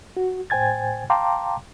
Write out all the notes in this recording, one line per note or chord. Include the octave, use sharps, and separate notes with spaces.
F#4
A2 C5 G5 G#5 G#6 A6
F5 G5 A5 A#5 C6 D6